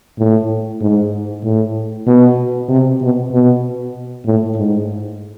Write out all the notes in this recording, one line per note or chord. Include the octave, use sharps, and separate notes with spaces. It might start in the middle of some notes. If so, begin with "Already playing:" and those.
A2
G#2
A2
B2
C3
B2
B2
A2
G#2